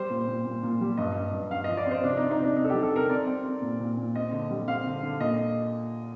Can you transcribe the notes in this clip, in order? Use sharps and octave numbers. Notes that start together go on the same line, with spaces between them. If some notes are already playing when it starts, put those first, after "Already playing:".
Already playing: G3 C5
A#2
A#2
A#2
A#2
G3
G2 D#5
G2
G2
G2 F5
F3 D#5
D5
C4
C5
C3 D4
D#4
C3
D#4
C3 D4
C3 D#4
A4
G3 G4
A4
C3 A#4
C4 D5
C4
C4
A#2
A#2
A#2
C4 D#5
D3
G3
C4 F5
D3
D3
A#2 D#5